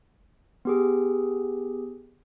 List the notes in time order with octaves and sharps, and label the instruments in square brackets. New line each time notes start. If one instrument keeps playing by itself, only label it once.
[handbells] B3 G4 G#4